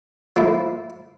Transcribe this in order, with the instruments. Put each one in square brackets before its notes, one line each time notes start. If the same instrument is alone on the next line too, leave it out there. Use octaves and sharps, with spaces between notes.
[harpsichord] F3 A#3 E4